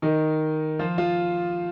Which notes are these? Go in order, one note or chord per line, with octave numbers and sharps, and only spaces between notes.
D#3 D#4
F3 F4
F3 F4